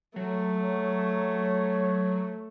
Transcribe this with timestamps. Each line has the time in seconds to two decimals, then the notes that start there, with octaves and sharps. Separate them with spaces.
0.16 F#3 A3
0.64 C#5